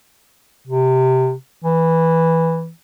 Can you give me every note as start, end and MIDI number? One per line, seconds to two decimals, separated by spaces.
0.67 1.34 48
1.64 2.71 52